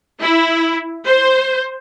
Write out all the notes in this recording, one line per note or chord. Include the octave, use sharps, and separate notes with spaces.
E4
C5